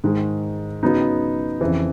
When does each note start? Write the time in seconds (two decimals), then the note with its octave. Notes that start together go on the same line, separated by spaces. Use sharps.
0.04 G#2 D#3 G#3
0.83 C#3 F#3 B3 D#4
1.61 F2 C#3 E3